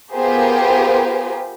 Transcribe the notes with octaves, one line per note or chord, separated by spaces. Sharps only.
B3 F4 G4 G#4 A#4 C5